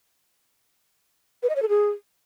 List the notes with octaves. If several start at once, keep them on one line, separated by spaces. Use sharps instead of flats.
B4
D#5
C#5
A4
G#4